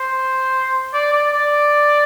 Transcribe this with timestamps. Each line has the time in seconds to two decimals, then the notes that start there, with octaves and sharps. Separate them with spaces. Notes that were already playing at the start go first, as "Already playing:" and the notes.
Already playing: C5
0.94 D5
1.13 D5
1.33 D5